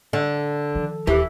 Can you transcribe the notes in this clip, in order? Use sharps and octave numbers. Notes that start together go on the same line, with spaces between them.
D3
D#3 F3
D#1 D#2 E3 G4